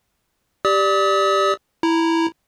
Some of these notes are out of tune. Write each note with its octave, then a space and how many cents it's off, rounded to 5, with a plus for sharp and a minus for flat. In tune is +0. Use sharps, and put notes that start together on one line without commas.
G4 +0 D5 +0 D#6 +45
E4 +0 A#5 +0